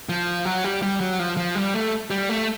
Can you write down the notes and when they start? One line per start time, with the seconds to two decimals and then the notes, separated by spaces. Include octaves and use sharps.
0.09 F3
0.45 F#3
0.64 G3
0.83 G3
1.01 F#3
1.19 F3
1.37 F3
1.55 G3
1.74 A3
2.10 G3
2.29 A3